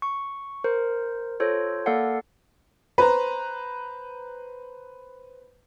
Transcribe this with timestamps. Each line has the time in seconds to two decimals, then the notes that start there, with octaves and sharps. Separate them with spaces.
0.02 C#6
0.64 A#4 C5
1.40 F4 A4 C5 C#5
1.86 A#3 A4 D5 F5 F#5
2.98 B4 C5 A#5